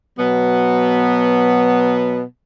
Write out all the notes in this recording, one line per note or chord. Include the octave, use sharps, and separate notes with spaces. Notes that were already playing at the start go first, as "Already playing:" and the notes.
B2 F#3 B3